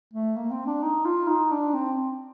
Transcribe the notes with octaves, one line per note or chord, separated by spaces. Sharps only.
A3
A#3
C4
D4
D#4
F4
D#4
D4
C4